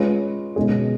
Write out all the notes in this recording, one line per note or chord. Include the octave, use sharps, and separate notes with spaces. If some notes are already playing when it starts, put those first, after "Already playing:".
Already playing: G#3 C#4 F4 B4
B2 G#3 C#4 G#4